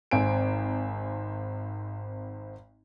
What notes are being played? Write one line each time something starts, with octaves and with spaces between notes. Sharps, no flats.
G#1 C4 G#5 D7